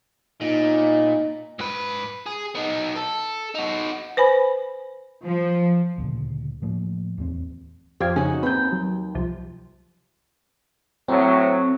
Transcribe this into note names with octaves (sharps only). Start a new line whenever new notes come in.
A#2 D#4
G#2 B4
G#4
B3 D#4
A4
D#4 F#4
B4 C5 G#5 B5
F3
D2 A#2 C#3
A2 F3 A#3
D1 E2 F#3 C4
F2 F3 G4 D5 F5 G#6
C#3 C#4 D#4 F#4 G#4
D#2 C4 B4 G5 G6
F#3
C2 F3
A2 F#3 C4